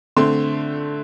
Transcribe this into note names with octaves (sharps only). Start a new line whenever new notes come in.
D3 A3 C4 C6